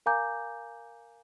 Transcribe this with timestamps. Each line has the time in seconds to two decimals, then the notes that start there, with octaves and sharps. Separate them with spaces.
0.06 A#4 F5 G#5 A#5 D6 G6